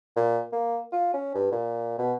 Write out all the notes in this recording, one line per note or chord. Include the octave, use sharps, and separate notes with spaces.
A#2
A#3
F4
C#4
G2
A#2
B2